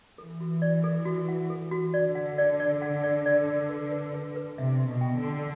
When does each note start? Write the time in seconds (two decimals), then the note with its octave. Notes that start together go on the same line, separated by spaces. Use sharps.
0.18 E3 A4
0.40 F#4
0.62 D5
0.84 A4
1.05 F#4
1.28 F#5
1.50 A4
1.71 F#4
1.94 D3 D5
2.15 F#5
2.38 D5
2.60 D5
2.82 F#5
3.03 D5
3.26 D5
3.47 D5
3.69 B4
3.91 B4
4.14 B4
4.36 B4
4.58 C3 E5
4.80 C6
4.87 B2
5.01 G5
5.16 D3
5.24 C6